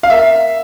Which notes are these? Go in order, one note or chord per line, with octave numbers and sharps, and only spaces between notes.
F5
A#3 E5